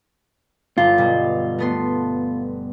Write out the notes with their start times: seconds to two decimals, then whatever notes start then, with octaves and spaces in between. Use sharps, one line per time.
0.78 G1 F4
0.98 B2 G3
1.58 A3 B3 C6